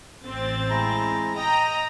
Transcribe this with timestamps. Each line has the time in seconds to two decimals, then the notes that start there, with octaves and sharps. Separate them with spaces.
0.25 A1 C4 A6
0.69 G#3 E4 A#5
1.37 D#5 G5 A#5 D#6